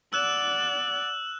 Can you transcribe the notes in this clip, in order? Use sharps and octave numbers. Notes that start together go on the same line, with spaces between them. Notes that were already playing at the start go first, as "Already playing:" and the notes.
D5 F#5 E6 F#6 E7 F#7